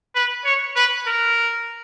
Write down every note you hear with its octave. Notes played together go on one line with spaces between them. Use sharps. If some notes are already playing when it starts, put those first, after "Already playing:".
B4
C#5
B4
A#4